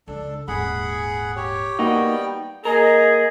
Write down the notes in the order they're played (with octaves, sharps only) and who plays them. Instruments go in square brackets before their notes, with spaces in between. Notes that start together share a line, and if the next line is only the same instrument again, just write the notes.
[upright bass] C#2 [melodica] D4 A4
[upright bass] D#1 G#2 [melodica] G#4 F#5 B5
[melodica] G4 C#5
[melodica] G3 B3 G5 [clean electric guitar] A#3 D#4 F#4
[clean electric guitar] A#3 A#4 [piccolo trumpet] G#4 [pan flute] D#5